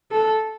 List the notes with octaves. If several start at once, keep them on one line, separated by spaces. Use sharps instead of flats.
A4